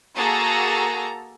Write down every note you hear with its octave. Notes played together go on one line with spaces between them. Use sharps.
A#3 F#4 G#4 A4 A5 A#5